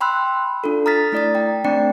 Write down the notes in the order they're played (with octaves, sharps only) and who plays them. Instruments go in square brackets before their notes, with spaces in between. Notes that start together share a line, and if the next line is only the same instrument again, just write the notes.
[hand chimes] G5 B5 C6 E6 F#6
D4 F4 A4
A#5 D#6 F6 A6 B6
A3 E4 D5 D#6 A6
G5 A#5
A3 C4 D4 D5 G5 C#7